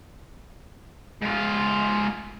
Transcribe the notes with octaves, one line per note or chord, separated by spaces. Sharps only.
G#2 F4